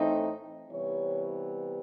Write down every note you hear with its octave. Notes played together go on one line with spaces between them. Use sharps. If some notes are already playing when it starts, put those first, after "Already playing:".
Already playing: A2 E3 A3 C4 D#4
C3 E3 G3 B3 C#5